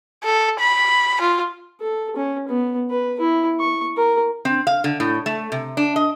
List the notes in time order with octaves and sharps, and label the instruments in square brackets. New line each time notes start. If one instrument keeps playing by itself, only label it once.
[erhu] A4
B5
F4
[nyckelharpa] A4
C#4
B3
B4
E4
C#6
A#4
[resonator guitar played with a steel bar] C4
F5
D3
A2
A3
C3
D4
D#5